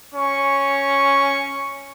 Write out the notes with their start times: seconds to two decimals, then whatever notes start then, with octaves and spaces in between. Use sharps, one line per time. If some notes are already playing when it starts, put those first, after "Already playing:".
0.14 C#4 C#6